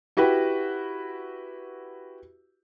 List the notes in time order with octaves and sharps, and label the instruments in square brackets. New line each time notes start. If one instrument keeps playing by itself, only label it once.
[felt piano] E4 F#4 G4 B4